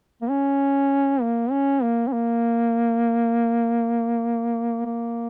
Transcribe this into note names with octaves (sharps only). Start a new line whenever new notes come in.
A#3
C#4
A#3
C#4
A#3
C#4
A#3
A#3